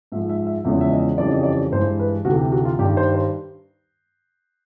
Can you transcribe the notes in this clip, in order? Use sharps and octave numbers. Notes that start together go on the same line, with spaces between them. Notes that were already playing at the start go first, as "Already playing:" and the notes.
G#2 F3 G#3 E5
E5
E5
E2 C#3 F3 G#3 E5
E5
D#5
F2 C#3 E3 G3 D5
D#5
D5
G2 E3 G#3 C5
B4
D2 C3 E3 A3 F#4
G4
F#4
F4
G2 D#3 G3 G4
C5
C5